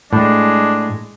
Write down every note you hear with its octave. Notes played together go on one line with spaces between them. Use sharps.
A2 G#3 D4